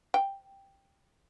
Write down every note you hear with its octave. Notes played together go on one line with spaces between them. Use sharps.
G5